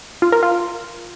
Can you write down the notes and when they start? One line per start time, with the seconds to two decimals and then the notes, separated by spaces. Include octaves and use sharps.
0.22 F4
0.32 A#4
0.43 F4